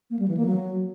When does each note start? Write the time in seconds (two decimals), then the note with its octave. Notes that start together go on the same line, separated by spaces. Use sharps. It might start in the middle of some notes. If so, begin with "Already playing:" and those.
0.10 A#3
0.19 G3
0.28 E3
0.37 A#3
0.46 F#3